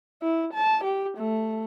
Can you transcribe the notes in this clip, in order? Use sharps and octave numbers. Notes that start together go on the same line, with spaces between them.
E4
A5
G4
A3